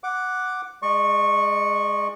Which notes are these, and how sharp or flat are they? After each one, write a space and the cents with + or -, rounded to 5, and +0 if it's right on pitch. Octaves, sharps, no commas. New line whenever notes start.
F#5 +0 D6 +0
G#3 +0 D5 +40 C#6 -10